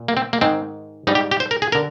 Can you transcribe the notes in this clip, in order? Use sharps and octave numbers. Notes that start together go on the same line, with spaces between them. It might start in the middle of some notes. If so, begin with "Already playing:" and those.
Already playing: A#2
A#3
C4
A#3
G#2 D#3 G#3 C4
G#2 G3 D#4
G4
G4
C5
A#4
G#4
D3 A#4